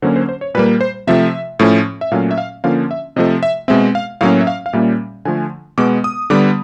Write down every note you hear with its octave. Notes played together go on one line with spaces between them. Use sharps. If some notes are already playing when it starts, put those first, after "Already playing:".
D3 F#3 A#3 C#4 C5
C5
C5
C#5
A#2 G3 A#3 B4
C5
C3 F3 A3 E5
A2 F3 A3 C#4
E5
A#2 F#3 A3 C#4 F5
E5
F5
D3 F3 A#3 C#4 F5
E5
C3 F3 A3 D#5
E5
B2 G#3 C4 E5
F5
A2 F#3 A#3 C#4 F5
E5
F5
F5
A#2 G3 A#3 C#4 E5
D3 F3 A3 G#5
B2 G#3 B3 D6
D#6
D3 G3 B3 D6